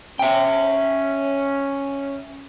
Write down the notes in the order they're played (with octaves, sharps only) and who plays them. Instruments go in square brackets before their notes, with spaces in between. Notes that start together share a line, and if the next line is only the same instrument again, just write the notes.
[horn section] C#4 [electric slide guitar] E5 G5